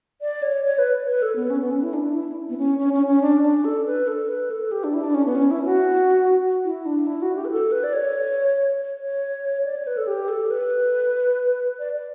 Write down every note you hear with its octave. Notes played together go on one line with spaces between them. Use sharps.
D5
C#5
C#5
B4
B4
A4
B3
C#4
B3
C#4
E4
D4
D4
E4
B3
C#4
C#4
C#4
C#4
D4
D4
A4
B4
A4
B4
A4
G4
D4
E4
D4
C#4
B3
C#4
E4
F#4
E4
D4
E4
F#4
G4
B4
A4
B4
D5
C#5
C#5
D5
C#5
B4
A4
G4
A4
B4
D5
D5